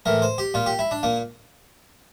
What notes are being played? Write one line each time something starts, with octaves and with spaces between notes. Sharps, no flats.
A2 E3 A#4
C5
G4
A#2 F4
G4
E4
D4
A#2 A#3